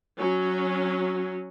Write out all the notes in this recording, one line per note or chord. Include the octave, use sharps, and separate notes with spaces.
F#3 C#4